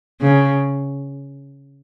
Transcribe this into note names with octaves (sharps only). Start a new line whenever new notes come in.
C#3